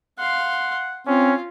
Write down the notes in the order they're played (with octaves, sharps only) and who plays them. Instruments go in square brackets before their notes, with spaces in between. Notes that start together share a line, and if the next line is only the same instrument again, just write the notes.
[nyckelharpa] F5 C6 [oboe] F#5
[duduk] C4 [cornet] C#4 [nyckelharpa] F4